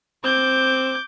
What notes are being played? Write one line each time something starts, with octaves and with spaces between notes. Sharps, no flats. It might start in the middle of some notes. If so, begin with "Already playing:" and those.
C4 D6 G6